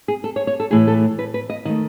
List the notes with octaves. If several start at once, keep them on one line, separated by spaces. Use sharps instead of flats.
G#4
A4
C#5
C#5
A4
A2 E3 A3 G#4
A4
B4
B4
D#5
D#3 A3 D#5